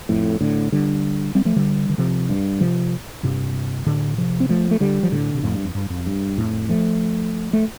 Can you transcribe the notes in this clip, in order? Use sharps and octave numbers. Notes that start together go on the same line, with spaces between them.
F2 A2
A2 D3
D3 G3
G3 C4
F3 A3
D3 G3
D3
C3 F3
G2
C3 F3
G2 C3
A2 D3
C3 F3
C4
F3 A3
A3
D3 G3
F3
A2 D3
C3
F2 A2
G2
F2
G2
F2
G2
F2 A2
F3 A3
A3